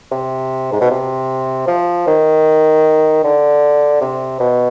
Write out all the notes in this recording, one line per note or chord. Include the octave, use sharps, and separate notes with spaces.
C3
G#2
B2
C3
F3
D#3
D3
C3
B2